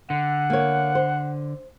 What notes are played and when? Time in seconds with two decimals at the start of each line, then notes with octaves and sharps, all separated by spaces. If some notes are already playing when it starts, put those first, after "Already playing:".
0.10 D3 F#5
0.50 A#3 C#5
0.95 C5